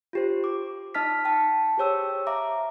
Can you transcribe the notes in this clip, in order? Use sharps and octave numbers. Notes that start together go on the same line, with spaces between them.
F4 G4 C5
D6
D#4 D#5 A5 F6 B6
G5 A5
G4 G#4 C5 C#5 G5 E6
E5 F5 A#5 D6